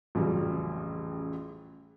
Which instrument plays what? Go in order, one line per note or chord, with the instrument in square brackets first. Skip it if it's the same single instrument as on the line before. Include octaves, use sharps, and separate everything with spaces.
[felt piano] A1 F2 C#3 F#3 G3